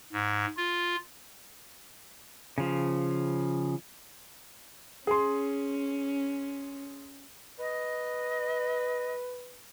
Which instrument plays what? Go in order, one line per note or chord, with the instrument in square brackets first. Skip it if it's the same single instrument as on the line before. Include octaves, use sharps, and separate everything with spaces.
[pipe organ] G#2
F4
[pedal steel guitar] C#3 F3
[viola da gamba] C#4 [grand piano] G#4 C6
[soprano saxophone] B4 [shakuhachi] D#5